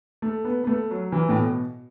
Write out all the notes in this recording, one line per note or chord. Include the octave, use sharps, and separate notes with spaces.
A3
B3
B3
A3
F#3
E3
A2
B2